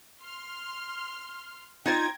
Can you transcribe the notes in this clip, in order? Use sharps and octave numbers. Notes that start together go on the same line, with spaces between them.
C6 F6
D#4 F4 C5 G5 G#6 A#6